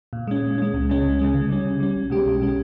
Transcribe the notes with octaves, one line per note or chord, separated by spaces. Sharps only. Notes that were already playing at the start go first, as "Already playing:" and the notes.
A#2
G#3 C#4
A#2
G#3 C#4
C#2
C#3 G#3 C#4
C#2
C#3 G#3 C#4
C#3
G3 C#4
C#3
G3 C#4
B1
B2 G#3 C#4 G4
B1
B2 G#3 C#4 G4